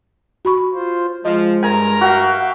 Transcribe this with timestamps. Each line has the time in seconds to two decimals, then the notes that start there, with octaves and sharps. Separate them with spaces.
0.45 F#4 B5 C#6
0.74 F4 C5
1.25 F3 G#3 D#5
1.63 G2 A#4 G#5 A#5
2.01 F#4 E5 F5 G5